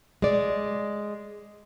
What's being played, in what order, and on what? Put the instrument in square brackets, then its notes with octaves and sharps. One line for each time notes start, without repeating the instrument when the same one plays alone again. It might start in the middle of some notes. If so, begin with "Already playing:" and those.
[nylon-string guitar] G#3 D5